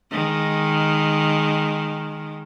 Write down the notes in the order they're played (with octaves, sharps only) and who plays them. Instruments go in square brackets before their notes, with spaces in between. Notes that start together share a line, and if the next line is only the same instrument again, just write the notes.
[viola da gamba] D#3 G#3